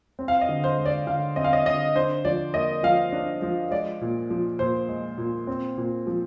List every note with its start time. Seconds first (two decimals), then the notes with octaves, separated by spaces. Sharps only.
0.19 C4
0.28 F5
0.41 D#5
0.49 D3
0.64 C5
0.78 G#3
0.85 D5
1.07 D3 F5
1.36 C4 D#5
1.44 F5
1.53 D#5
1.66 D3 D#5
1.95 D4 C5
2.25 F3 D5
2.54 A#3 D#5
2.83 F3 F5
3.12 D4
3.42 F3
3.71 G#3 D5
4.01 A#2
4.30 F3
4.59 A#2 C5
4.89 G#3
5.18 A#2
5.47 C4
5.77 A#2
6.07 F3